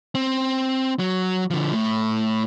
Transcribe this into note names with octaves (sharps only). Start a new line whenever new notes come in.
C4
F#3
D3 F3
A2